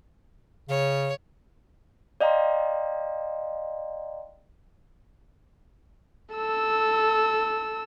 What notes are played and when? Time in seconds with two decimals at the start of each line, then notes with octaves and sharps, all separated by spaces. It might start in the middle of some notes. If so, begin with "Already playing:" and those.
0.69 C#3 C#5
2.20 D5 D#5 F5 G5 A#5 C6
6.34 A4 E6